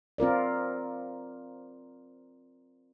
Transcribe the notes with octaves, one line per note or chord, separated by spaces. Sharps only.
C4 F4 A#4 D5